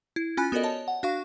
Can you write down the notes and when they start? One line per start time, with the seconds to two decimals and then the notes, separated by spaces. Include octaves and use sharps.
0.16 E4
0.37 C#4 F4 G#5 B5 F#6
0.52 B3 F#4 A4 A#4 D5 D#5
0.63 C#5 D#5 A5
0.88 F#5
1.03 D4 F#4 F5 C#6